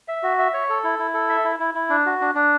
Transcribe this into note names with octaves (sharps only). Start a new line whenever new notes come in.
E5
F#4
E5
C#5
A4
E4
E4
A4
E5
E4
E4
E4
D4
F#4
D4
D4